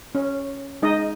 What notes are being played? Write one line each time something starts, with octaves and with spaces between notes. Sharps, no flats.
C#4
G#3 D#4 D#5